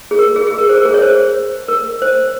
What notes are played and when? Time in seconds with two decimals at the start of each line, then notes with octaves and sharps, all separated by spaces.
0.11 G#4
0.19 A#4
0.36 G#4
0.47 G#4
0.58 A#4
0.69 C5
0.78 A#4
0.86 G#4
0.94 C#5
1.02 C5
1.68 A#4
2.02 C5